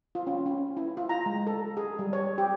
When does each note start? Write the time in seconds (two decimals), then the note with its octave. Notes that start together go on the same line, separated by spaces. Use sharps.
0.15 F4
0.27 C#4
0.46 C#4
0.77 E4
0.97 F4
1.09 A#5
1.26 G#3
1.47 A4
1.77 G#4
1.99 G3
2.13 C#5
2.38 G4